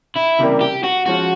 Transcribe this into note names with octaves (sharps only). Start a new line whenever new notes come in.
E4
C#2 C3 E3 G3 A#3
G4
F#4
F3 G#3 C#4 F4 F#4